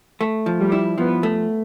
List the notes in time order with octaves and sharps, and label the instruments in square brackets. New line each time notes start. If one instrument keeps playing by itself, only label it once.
[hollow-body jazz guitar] A3
F3
[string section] G3
[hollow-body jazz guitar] E4
[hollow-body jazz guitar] F3 [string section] B3
[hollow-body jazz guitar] A3